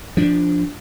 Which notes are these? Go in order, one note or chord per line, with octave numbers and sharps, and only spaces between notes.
F3 D4